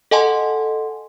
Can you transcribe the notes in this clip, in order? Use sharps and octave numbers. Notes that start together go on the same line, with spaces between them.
A4 D#5 F#5 G#5 A5 C6